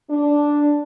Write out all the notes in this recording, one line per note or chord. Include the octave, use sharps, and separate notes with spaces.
D4